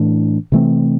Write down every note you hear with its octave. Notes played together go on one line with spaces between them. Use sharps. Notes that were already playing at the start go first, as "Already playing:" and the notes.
Already playing: A2 E3 A3 D4
C3 E3 A3 C4